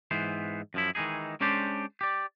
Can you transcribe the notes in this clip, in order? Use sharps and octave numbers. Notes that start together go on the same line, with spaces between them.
G#2 E3 B3 C5
F#2 F3 E4
D#3 E3 G#3 D#4 G#4
G#3 C#4 D4 G4 C5 D5
G4 D5